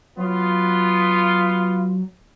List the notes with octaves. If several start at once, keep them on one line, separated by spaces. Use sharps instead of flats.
F#3 B3 F4